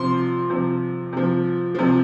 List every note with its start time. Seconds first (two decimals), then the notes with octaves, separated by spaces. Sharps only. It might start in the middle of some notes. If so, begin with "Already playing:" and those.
Already playing: C3 F3 C6
0.50 C3 F3
1.13 C3 F3
1.75 C3 F3